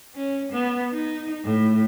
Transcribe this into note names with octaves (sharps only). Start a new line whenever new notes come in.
C#4
B3
D#4
A2